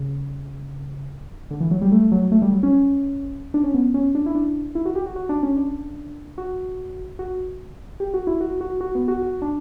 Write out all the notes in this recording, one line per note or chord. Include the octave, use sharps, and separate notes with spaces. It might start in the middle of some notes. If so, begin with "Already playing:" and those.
Already playing: C#3
D3
E3
F#3
G3
A3
F#3
A3
G3
F#3
C#4
D4
C#4
B3
C#4
D4
E4
D4
E4
F#4
G4
F#4
F#4
D4
C#4
D4
F#4
F#4
G4
F#4
E4
F#4
F#4
F#4
B3
F#4
F#4
D4